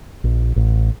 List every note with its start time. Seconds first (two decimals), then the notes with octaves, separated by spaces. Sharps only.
0.24 A#1
0.56 A1